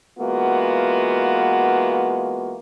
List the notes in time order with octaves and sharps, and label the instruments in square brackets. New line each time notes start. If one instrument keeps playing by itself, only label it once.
[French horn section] E3 G#3 A#3 B3 F4 F#4